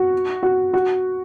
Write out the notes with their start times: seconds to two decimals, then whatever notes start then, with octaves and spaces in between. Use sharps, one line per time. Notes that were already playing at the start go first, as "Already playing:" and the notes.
Already playing: F#4
0.43 F#4
0.73 F#4